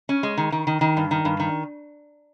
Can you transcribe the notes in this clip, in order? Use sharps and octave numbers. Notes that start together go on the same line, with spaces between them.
C#4
G#3
D#3
D#3
D#3
D#3
G2
D#3
G2
D#3